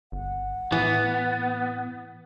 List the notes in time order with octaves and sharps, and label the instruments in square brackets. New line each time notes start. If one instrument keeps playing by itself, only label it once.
[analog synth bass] G1 [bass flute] F#5
[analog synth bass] A2 [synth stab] E3 [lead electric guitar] B3